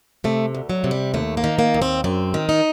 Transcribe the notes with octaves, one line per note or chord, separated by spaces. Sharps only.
C3 A3
D2
F#3
C3
G3
D#2 A3
A#3
D#3
A#3
D#2
C4
F#2 C4
D#3
D#4